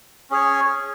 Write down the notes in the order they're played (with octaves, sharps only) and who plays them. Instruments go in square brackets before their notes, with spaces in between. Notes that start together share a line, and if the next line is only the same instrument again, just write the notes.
[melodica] C#4 G#4 C#5